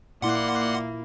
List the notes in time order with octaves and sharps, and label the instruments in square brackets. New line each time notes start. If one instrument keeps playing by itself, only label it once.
[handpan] A#2 E4 [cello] A#3 [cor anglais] D5 [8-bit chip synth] F#5 C6